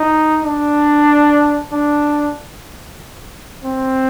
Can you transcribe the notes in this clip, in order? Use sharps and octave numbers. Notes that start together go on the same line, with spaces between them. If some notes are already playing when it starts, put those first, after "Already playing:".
Already playing: D#4
D4
D4
C4